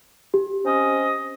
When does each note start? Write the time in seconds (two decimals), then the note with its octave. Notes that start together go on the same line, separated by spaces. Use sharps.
0.34 G4
0.64 C4 C#4 D#5